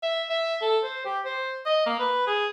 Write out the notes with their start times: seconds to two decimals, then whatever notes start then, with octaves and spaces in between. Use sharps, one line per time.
0.03 E5
0.29 E5
0.62 A4
0.83 C5
1.05 G4
1.25 C5
1.66 D#5
1.86 A#3
1.99 B4
2.27 G#4